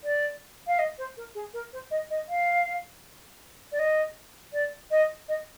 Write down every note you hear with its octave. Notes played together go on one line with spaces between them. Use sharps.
D5
F5
D#5
C5
A#4
G#4
A#4
C5
D#5
D#5
F5
D5
D#5
D5
D#5
D#5